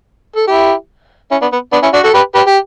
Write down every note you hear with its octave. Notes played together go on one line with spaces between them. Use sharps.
A4
E4 G4
C#4 E4
B3 D4
B3
B3 D4
C#4 E4
D4 F#4
F#4 A4
G4 B4
G4 B4
G4